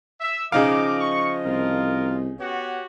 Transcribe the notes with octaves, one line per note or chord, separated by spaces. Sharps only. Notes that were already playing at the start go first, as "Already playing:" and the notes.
E5
C#3 F3 D#4 D#5 F5 D6
C#6
C2 F4 A#4
B3 F#4 G4 C#5 F#5